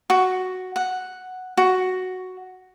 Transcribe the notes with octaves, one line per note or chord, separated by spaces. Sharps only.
F#4
F#5
F#4